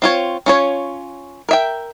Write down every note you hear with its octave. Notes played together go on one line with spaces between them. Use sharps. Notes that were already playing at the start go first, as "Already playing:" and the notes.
C4 F4 C#5
C#4 F4 C#5
A#4 E5 G5